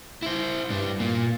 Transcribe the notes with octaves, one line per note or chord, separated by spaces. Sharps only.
E4 C5
G2 D4
A#2 A#3